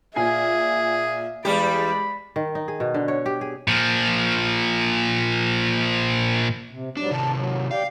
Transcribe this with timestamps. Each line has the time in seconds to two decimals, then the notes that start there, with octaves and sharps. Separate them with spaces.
0.16 A#2 G#4 E5 G#5 G#6
1.45 E2 G3 G#3 G4 D5 B5
2.36 D#3
2.55 D#4
2.68 G#4
2.80 B2
2.94 D3
3.08 C#5
3.26 G4
3.41 G#4
3.68 A#2 F3
6.70 C3
6.97 G#2 F#3 G3 D4
7.11 C3 D#3 A5
7.35 F#3
7.71 G4 D5 F5 G5